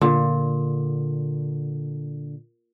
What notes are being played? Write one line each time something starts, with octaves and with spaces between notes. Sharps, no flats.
A#2 D3